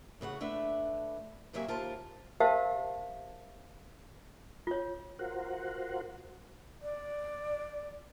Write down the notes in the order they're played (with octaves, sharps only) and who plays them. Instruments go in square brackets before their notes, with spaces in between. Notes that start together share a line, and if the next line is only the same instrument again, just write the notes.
[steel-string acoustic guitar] A2 C#3 F#4 F#5
A3 D4 B4 E5
F#2 C3 F#3 A#3 E5 G#5
D#2 F4 A#4 C5 A5
[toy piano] G4 A#4 C5 E5 F5 A5
F4 C#5
[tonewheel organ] F4 F#4 A#4 C5 F#5
[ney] D5